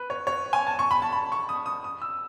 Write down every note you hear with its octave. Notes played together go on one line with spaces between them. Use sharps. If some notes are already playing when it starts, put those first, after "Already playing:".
Already playing: B4
C#5
C#5
G#5
A5
C#6
B5
A5
B5
C#6
D#6
D#6
D#6
E6